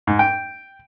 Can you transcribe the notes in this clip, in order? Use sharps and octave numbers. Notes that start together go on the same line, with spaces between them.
G#2
G5